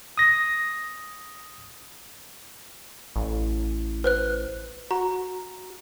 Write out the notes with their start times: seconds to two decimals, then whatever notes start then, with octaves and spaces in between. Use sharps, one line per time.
0.18 D#6 A#6
3.16 A1
4.04 B4 C5 F#6
4.91 F#4 A#5